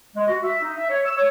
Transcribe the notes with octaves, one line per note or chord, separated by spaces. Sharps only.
G#3
F#4
E5
D#4
E5
C#5
E6
C#5